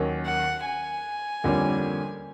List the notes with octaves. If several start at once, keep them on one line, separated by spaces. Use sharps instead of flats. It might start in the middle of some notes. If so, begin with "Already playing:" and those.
Already playing: D#2 D#3 F#3 A#3 C#4
F#5
G#5
F2 D3 G3 A#3 C#4